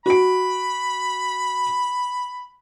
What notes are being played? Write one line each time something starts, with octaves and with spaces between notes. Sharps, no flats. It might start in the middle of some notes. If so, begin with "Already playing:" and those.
F#4 B5 D7